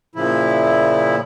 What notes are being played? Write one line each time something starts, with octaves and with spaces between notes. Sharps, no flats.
A#2 C#3 F3 E4